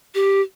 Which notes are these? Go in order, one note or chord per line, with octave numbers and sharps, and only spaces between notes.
G4